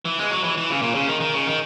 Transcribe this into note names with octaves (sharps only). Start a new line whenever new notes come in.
E3
G#3
F#3
E3
E3
C#3
A#2
C#3
D#3
D#3
C#3
D#3